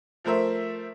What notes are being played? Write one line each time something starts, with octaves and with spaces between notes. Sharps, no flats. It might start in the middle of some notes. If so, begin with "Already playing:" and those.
F3 A3 A#4 C5 E5